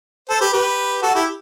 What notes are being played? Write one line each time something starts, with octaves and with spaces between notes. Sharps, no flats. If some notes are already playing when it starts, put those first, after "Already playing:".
A4 C5
G4 B4
G4 B4
F#4 A4
E4 G4